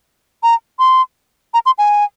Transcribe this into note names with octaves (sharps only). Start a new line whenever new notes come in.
A#5
C6
A#5
C6
G#5